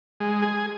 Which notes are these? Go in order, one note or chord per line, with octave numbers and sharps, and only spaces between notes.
G#3
G#4